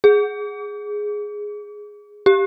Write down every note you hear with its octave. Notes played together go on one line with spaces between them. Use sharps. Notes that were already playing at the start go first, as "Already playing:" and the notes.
G#4
G4